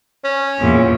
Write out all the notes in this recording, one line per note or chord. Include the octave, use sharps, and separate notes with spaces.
C#4
E2 A#2